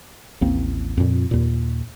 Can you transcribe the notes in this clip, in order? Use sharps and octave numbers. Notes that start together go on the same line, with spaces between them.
A1 D#2 A#3 C4
F2 A#2
D#2 A#2